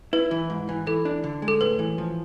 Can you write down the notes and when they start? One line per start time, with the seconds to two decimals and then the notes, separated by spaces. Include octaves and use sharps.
0.13 E4 B4
0.31 E3
0.50 G#2
0.69 E3
0.87 E3 A4
1.05 D4
1.24 D3
1.42 G#3
1.48 A4
1.61 A2 B4
1.79 E3
1.98 F3